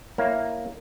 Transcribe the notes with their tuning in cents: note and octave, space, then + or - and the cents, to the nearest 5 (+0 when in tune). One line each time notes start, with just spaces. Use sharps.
A#3 +0 E4 +0 C#5 +0